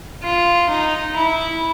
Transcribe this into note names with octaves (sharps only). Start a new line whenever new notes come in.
F4
D#4
E4